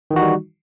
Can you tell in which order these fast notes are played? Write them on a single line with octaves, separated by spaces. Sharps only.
D#3 E3 F#4 D#4 G3